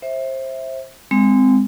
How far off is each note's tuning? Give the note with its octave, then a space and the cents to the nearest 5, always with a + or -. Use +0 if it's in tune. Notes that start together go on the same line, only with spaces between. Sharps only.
C5 +25 E5 -5
G#3 -15 C4 -20